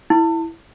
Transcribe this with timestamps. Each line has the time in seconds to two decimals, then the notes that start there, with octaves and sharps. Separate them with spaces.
0.10 E4